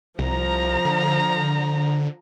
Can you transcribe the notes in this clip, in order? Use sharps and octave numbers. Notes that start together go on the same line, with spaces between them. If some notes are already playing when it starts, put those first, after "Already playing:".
C2 F3 A#5
D3